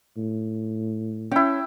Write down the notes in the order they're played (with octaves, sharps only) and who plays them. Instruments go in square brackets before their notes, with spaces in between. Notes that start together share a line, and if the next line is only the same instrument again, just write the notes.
[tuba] A2
[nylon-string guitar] C#4 [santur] E4 G5